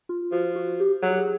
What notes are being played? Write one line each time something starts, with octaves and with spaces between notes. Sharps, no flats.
F4
F3 F#4
F#4
G4
F#3 G#4
G4
G#4